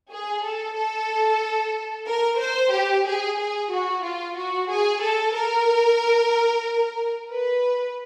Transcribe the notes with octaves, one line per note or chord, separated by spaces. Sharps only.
G#4
A4
A4
A#4
C5
G4
G#4
G#4
F#4
F4
F#4
G#4
A4
A#4
B4